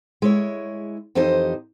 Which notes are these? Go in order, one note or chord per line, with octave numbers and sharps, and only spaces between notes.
G#3 E4 C#5
F2 E3 D#4 G4 C5 D#5